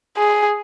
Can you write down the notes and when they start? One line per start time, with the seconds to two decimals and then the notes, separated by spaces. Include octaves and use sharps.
0.18 G#4